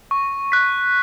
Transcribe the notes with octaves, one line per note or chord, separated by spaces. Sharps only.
C#6
F#6 B6